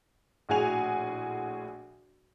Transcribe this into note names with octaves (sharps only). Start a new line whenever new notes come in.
A#1 A2 F#4 G#4 G#5 F7